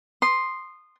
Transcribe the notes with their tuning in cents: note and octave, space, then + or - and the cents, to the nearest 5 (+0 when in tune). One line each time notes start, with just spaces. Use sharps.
C6 +0 D#6 -20